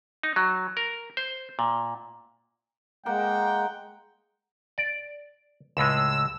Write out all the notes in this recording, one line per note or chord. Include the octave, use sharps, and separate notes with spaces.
D#4
F#3
A#4
C5
A#2
G#3 A#3 F#5 G5
D5
C#2 A2 G#3 E6